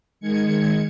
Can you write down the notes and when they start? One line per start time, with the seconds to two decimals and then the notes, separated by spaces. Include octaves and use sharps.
0.20 D#3 G#3 G#6 C#7